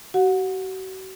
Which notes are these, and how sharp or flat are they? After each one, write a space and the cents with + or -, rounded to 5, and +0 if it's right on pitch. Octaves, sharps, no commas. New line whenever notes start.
F#4 +40 F#5 -25